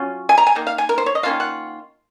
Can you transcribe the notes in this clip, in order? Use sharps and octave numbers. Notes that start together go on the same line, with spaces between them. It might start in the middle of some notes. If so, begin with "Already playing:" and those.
Already playing: F#3 C#4 F4
G#5
A#5
G#5
D#3 A#3
F5
G#5
A#4
C5
C#5
D#5
D#3 A#3 C#4 F4 F5
F#5